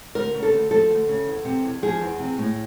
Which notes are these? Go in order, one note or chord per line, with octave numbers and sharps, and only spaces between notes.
D2 A#4
C#3
A4
D2
F3 A4
D2
C#3
E2
C3
E2
F3 G#4
E2
C3
A2